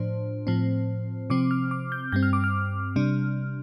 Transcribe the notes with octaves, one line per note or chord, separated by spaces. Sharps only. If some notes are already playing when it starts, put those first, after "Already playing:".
Already playing: A2 F3 D4 C5
A2 F3 C4
C3 F3 C4 D6
F6
D6
G6
G2 G3 C4 G6
F6
D6
F6
C3 G3 D4